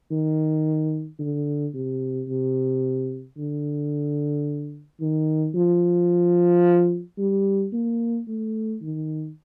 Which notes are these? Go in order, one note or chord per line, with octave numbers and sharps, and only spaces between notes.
D#3
D3
C3
C3
D3
D#3
F3
G3
A#3
A3
D#3